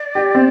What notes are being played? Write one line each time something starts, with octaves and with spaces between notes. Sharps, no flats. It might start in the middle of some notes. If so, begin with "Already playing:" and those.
Already playing: D5
G4
C4